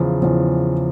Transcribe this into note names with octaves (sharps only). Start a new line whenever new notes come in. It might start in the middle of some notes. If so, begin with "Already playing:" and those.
Already playing: E2 C#3 F3
E2 C#3 F3